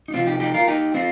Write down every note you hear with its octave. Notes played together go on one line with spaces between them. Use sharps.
D#4
C3 F3 C4 F4
D#4 G4
D#4 G4
F4 A#4
D#4 G4
C4 F4